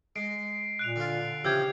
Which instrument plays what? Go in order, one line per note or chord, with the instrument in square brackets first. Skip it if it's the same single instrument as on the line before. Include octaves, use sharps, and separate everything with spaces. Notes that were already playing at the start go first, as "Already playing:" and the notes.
[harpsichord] G#3 [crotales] C7 D7
[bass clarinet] A#2 [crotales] F#6 D7 F7
[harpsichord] D3 F4
[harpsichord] C#3 E3 F3 [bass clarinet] G4 [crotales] E6 G6 G#6